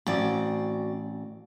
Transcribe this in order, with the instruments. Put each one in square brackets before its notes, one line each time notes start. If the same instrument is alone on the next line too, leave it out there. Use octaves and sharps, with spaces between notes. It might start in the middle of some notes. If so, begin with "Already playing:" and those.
[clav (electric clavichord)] A1 [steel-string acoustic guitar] C4 F#4 D5